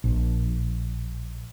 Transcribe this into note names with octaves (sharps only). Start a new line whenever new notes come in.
A#1